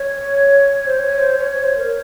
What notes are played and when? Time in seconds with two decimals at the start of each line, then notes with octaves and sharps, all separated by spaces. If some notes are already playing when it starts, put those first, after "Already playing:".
Already playing: C#5
0.87 C5
0.99 C#5
1.19 C5
1.38 C#5
1.50 C#5
1.64 C5
1.77 A#4